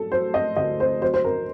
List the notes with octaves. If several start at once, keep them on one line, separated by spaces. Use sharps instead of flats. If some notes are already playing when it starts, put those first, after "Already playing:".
Already playing: F#3 A4
F#3 C5
D#5
D2 D#5
C5
F#3 C5
C5
A#4